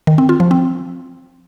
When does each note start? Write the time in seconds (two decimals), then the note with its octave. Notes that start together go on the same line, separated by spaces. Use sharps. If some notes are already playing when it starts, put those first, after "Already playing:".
0.07 D#3
0.18 C4
0.29 F4
0.40 F3
0.51 C4